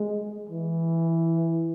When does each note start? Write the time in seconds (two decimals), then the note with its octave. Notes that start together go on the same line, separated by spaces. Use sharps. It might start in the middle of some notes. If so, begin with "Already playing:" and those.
Already playing: G#3
0.49 E3